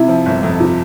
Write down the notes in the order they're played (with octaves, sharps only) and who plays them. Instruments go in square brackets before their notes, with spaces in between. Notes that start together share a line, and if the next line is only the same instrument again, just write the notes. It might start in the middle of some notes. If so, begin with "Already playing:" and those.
Already playing: [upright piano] C3 [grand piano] E4
[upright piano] F3
G1
F2
[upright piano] C3 [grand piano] F4